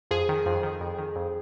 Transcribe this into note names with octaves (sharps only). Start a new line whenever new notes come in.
F2 G#4
D#3
F2
D#3
F2
D#3
F2